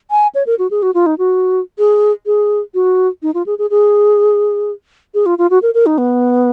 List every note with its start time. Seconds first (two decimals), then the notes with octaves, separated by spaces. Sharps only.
0.11 G#5
0.35 C#5
0.47 A#4
0.59 F#4
0.71 G#4
0.82 F#4
0.94 F4
1.06 D#4
1.18 F#4
1.79 G#4
2.26 G#4
2.74 F#4
3.23 D#4
3.34 F4
3.46 G#4
3.59 G#4
3.70 G#4
5.14 G#4
5.26 F4
5.38 F4
5.50 F#4
5.62 A#4
5.74 A#4
5.86 D#4
5.98 B3